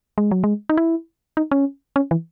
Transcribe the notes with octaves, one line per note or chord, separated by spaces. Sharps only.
G#3
F#3
G#3
D#4
E4
D#4
C#4
C#4
E3